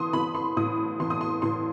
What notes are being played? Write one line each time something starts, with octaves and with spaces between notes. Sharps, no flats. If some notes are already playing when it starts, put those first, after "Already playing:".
Already playing: E3 C6 D#6
E3 B5
C6
A2 D#6
E3 C6
D#6
C6
A2 C6